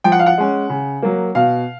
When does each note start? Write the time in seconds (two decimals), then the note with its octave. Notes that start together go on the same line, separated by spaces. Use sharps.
0.04 F3 G5
0.12 F#5
0.19 F5
0.26 F#5
0.38 G#3 C#4
0.70 C#3
1.02 F#3 A#3
1.35 B2 F5